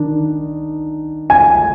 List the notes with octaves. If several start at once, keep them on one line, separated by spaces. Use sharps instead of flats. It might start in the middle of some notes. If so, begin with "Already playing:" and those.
Already playing: D#3 D4
G#5